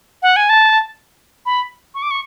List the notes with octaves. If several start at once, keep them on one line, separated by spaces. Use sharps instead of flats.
F#5
G#5
A5
B5
C#6
D6
C#6